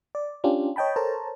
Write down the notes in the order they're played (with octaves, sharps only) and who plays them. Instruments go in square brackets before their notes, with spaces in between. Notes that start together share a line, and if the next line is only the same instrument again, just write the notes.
[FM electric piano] D5
C#4 D4 F4 G4
C#5 D#5 G5 A5 B5
A4 A#4 C5 C#5 A5 A#5